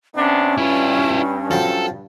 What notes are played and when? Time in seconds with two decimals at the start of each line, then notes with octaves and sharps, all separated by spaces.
0.16 C3 B3 C#4 D4
0.58 G2 E4 F4
1.51 F3 F#3 A4 G5